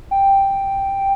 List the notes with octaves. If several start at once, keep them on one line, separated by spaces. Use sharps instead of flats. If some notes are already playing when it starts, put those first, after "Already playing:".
G5